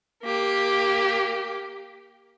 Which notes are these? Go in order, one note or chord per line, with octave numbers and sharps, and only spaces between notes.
A#3 G4